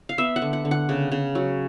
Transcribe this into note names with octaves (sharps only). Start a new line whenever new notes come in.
F5
B3 E5
F#5
D3
F#5
D3
F#5
C#3
C#3
F#3